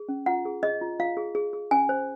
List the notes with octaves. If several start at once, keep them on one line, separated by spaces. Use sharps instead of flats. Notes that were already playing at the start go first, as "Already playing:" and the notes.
Already playing: G#4
C#4
F4 F#5
G#4
G#4 D#5
F4
F4 F5
G#4
G#4
G#4
C#4 G#5
C5